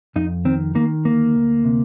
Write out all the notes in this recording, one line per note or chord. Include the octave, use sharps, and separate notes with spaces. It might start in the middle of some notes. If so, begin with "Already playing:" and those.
F2 D#4
D#3 C4
D#3 A#3
D2 A#3
D2
C3